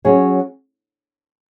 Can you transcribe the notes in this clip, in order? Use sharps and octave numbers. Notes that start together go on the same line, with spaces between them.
F#3 C#4 G#4 C#5